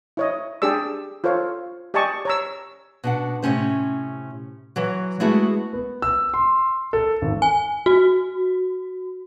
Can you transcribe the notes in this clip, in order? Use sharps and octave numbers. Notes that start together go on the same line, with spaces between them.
E4 C#5 D#5
D4 G4 G#4 D5 E6
F4 A4 C5 C#5 F5
G4 D5 D#5 G#5 A5 C#6
C#5 A#5 E6
B2 D4 F#5
A2 C3 C#4 C5
E3 F#3
G#3 A3 B3 E4 F#4 G#4
B3
E6
C6
A4
G#1
G#5
F#4